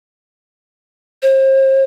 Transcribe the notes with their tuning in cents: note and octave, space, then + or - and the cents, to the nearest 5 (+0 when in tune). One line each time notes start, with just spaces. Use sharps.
C5 +35